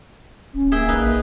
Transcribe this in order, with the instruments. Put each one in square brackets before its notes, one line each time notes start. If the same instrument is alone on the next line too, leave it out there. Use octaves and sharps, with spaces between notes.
[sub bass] D1 [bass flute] C#4
[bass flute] A#3 [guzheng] G#4 E5 G5
[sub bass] A1 [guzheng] D#4 B4
[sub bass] A#1